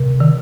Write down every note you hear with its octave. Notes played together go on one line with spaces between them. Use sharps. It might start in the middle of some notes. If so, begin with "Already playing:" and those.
Already playing: C3
D#3